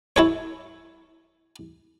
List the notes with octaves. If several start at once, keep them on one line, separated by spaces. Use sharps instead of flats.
E4 A4 C#5